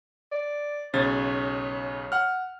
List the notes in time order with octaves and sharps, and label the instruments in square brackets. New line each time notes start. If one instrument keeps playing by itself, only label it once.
[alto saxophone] D5
[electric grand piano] B1 C#3 A6 [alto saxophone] C#5
[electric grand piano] F#5 F6